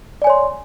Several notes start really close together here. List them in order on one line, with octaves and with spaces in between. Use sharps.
D5 G#5 C#5 C6